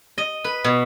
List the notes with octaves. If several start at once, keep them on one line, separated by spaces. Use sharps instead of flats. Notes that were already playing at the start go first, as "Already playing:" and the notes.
D#5
B4
B2